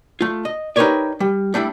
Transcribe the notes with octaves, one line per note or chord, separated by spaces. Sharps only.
A3 F4
D#5
D#4 G4 A#4 B4 C#5 D5
G3
G3 A3 D4 E4